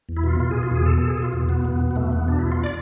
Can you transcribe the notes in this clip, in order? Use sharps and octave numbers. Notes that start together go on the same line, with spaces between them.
E2
E4
B2 F4
B2 F4
B2 G#4
F4
E2 G#4
B2 A4
B2 A4
G#4
B2 F4
E2
B2 B3
E2 B3
B2
B3
E2 A3
E2 B3
B2 D4
E2 E4
F4
D5